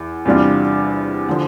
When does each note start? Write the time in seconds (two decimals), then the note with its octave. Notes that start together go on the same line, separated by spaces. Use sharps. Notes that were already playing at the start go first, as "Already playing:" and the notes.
Already playing: E2
0.25 E2 C3 G3 D4 F4
1.29 D3 F3